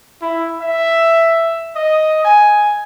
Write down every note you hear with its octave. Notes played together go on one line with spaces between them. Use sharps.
E4
E5
D#5
G#5